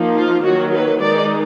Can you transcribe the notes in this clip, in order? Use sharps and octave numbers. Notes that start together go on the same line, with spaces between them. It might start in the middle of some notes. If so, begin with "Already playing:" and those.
Already playing: F3 A#3 D#4
F4
D#3 F#3 A#3 F#4
B4
D#3 G#3 D#4 D5